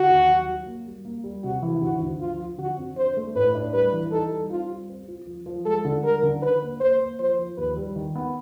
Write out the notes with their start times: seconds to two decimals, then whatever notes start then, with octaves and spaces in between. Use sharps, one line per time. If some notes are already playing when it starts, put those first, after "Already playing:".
Already playing: D3 F#4
0.09 D#2
0.29 F#3
0.48 F#3
0.66 A#3
0.86 G3
1.05 A#3
1.24 G3
1.43 C3 F#4
1.62 E3
1.82 D2 F#4
2.01 D2
2.20 F3 F4
2.39 F3
2.58 D3 F#4
2.77 F2
2.97 D4 C5
3.17 A3
3.35 A2 B4
3.55 D4
3.73 G3 B4
3.93 E3
4.11 D#4 A4
4.31 G3
4.50 C4 F4
4.70 G3
4.89 C4
5.08 F4
5.27 F3
5.46 F3
5.66 G#3 A4
5.85 D3
6.04 G3 A#4
6.23 D3
6.42 D3 B4
6.62 A#3
6.80 A#3 C5
7.00 A#3
7.19 F3 C5
7.39 F3
7.57 D#2 B4
7.77 G3
7.96 D#3
8.15 B3